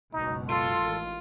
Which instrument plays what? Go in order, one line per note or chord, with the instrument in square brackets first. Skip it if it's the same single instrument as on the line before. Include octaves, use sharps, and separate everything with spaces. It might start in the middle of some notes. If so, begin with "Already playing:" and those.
[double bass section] F#1 C#2 B2 [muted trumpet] D#4
[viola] F4 [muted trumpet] A4 [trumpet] C6
[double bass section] A1 D#3